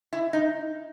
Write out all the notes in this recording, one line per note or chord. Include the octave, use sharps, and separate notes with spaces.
E4
D#4